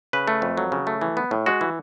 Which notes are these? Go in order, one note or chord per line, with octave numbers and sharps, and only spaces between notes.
C#3 B4
A3
F2
F#3
C#3
A3
E3
B3
A2
G#3 F#4
E3